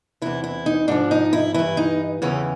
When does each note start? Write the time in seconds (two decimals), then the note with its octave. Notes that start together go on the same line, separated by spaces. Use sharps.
0.22 E2 C3 E3 E4
0.44 E4
0.66 D#4
0.88 G#2 F3 D4
1.11 D#4
1.33 E4
1.54 G2 E3 E4
1.77 D#4
2.22 E2 C#3 E3 C#4